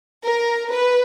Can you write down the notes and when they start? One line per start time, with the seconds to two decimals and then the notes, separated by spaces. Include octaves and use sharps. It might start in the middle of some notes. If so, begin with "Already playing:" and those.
0.24 A#4
0.69 B4